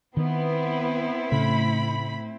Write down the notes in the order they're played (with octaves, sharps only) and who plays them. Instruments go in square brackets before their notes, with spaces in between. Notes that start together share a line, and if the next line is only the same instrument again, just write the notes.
[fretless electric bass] D#3 [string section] B3 [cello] C4 E4
[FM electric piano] A2 A3 [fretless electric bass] C#3 [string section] B5